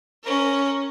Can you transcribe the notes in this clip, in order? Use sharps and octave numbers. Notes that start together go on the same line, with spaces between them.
C#4 A#4